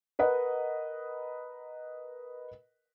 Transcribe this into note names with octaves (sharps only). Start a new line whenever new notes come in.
A#4 B4 D#5 F#5